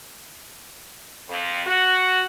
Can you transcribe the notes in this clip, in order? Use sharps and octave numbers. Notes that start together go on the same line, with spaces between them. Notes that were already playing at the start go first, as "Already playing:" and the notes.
F2
F#4